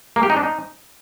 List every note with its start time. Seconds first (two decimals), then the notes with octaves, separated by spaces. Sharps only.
0.16 A#3
0.23 G4
0.30 D#4
0.37 D4
0.43 D#4